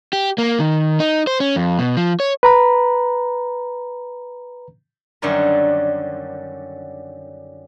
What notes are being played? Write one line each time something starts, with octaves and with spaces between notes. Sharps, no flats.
G4
A#3
D#3
D#4
C5
C#4
F2
B2
F3
C#5
B4 A#5 B5
F#2 D3 D#3 F#3 G3 A#4